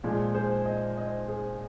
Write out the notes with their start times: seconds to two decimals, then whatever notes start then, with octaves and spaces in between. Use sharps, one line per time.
0.03 A#2 F3 G#3
0.34 G#4 C5
0.66 C5 D#5
0.97 C5 D#5
1.28 G#4 C5